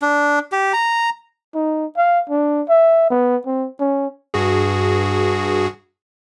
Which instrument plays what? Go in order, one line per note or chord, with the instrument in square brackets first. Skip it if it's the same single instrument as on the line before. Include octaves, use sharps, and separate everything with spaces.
[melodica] D4
G4
A#5
[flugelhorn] D#4
F5
D4
E5
B3
C4
C#4
[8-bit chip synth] G2 F#4 G#4